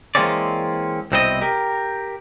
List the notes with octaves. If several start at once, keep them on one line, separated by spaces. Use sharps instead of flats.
E3 G#3 A#3 C4 C#4 D5
C2 B2 C4 E4 G4 D#5
G4 A#4